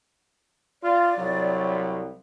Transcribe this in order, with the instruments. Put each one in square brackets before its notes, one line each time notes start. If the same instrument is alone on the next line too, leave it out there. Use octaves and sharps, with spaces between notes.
[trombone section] F4 [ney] D5
[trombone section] C2 F#3